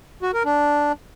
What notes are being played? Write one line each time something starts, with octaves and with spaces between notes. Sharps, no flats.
F#4
A#4
D4